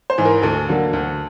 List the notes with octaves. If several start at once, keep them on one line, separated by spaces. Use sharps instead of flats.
C5
G#2 E3
A#4
D2 A4
D3 F#3 A#3
D2